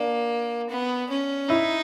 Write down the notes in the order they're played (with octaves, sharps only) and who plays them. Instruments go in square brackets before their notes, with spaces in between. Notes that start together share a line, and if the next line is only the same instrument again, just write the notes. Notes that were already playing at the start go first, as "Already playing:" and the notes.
Already playing: [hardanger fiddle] A#3 [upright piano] D4
[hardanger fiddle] B3
C#4
[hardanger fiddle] D#4 [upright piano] E4